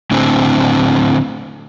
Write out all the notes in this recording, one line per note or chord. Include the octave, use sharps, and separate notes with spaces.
A2 D3 C4